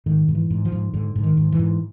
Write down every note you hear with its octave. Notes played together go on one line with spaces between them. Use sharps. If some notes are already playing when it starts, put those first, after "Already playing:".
G#2 D#3
G#2
E3
G#2
F3
G#2
G#2 D3
G#2
D#3
G#2
E3
G#2